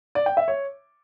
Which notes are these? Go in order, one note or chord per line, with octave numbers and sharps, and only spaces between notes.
D5
G5
E5
C#5